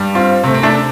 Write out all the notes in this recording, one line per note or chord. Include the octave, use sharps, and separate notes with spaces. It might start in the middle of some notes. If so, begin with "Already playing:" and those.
Already playing: G2 G3
C4 F4
C3 A3 C4
C4
A3 D4